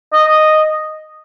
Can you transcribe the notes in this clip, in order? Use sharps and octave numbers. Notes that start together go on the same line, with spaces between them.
D#5